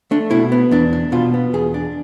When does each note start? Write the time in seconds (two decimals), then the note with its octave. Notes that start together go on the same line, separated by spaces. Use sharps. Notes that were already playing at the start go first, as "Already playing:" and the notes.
0.11 A3 D4
0.31 B2 E4
0.52 B3
0.71 E2 D4
0.93 D4
1.12 B2 F4
1.34 B3
1.53 E2 G#4
1.74 D4